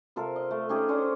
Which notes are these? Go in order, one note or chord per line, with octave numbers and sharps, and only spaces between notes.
C3 F4 A4 A#4
D#5
A3
C#4 D#4 G4 G#4
C#4 D4 C5